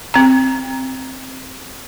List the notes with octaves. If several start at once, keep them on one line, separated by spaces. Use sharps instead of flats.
C4 A#5